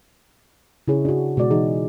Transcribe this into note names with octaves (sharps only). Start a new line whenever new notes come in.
C#3 E4 G#4 C#5
D4 F#4
B2 G#3 F#4 D5
E3 D#4 G#4